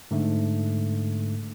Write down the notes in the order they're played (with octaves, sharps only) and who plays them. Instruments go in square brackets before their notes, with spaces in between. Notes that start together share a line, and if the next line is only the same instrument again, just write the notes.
[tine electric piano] G#2 D3 A3